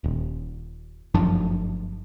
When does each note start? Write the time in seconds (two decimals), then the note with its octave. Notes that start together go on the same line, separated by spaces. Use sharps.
0.04 D#1
1.14 G1 F#2 F3 D4